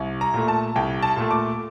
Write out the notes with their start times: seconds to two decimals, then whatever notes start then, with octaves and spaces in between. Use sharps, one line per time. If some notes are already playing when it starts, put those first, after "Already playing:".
Already playing: C2
0.21 A#5
0.34 A#2 A3
0.48 A5
0.76 C2 G5
1.02 A5
1.17 A#2 A3
1.31 D6